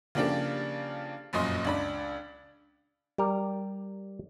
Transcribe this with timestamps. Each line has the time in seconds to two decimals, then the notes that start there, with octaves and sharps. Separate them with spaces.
0.15 C#3 F3 A#3 D4 G4 A4
1.33 F1 F#2 A#2 D#5 C6
1.65 C#2 D4 B5
3.18 G3 A#4